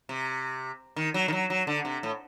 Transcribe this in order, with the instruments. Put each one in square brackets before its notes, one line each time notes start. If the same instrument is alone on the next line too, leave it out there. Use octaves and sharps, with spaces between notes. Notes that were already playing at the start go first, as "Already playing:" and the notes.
[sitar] C3
D#3
F#3
D#3
F#3
F#3
D3
C3
A2